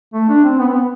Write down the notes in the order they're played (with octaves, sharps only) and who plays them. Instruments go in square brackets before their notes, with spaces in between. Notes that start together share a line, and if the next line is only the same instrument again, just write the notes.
[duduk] A3
D4
C4
B3
C4
B3